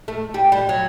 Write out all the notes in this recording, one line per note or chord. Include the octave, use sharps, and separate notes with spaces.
A3
G3
G3
F#3